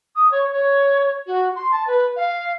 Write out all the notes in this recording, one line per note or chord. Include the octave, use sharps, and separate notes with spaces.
D#6
C#5
C#5
F#4
C6
A5
B4
F5